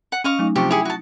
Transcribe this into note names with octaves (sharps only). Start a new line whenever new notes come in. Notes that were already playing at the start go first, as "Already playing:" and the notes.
F#5
C#4 D#5 F5 C#6
F#3 A3 D#4
C3 F3 G4 C#6
E4 G4 G#4 D#6 C#7
F#4 A5